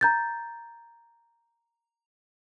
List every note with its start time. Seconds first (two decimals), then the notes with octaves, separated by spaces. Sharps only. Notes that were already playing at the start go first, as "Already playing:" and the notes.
0.01 A#5 G6 A6